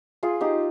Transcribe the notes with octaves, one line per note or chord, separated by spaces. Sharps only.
F4 G#4
D#4 G4